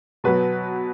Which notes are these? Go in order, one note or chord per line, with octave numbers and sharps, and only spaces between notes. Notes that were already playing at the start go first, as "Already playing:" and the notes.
B2 F#3 B4